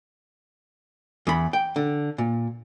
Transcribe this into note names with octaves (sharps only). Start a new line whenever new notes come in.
E2 B5
G5
D3
A#2